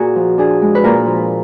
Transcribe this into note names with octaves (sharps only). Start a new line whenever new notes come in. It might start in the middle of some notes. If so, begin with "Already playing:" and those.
Already playing: A#2 F#4 G#4 A#4
F3
D4 G#4
G#3
B4
A#2 A#4
F3